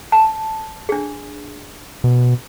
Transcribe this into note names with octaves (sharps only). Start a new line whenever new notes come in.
A5
D4 G#4
B2